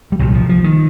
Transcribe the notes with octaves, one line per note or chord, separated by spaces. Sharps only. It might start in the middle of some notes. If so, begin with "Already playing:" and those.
G3
C2 A#2 F#3
F3
F3
D#3